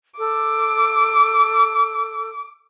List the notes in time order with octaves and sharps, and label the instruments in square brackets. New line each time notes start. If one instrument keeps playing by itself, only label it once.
[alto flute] A4 [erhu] D6